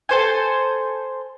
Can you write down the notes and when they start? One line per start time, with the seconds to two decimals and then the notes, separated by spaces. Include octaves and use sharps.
0.09 A4 C5 G#5